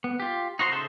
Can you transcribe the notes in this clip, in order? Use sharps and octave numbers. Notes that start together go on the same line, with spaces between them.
B3
F4 G4
D#4 F#4 C5 A#5 C6
C#3 D#4 A4 C5 E5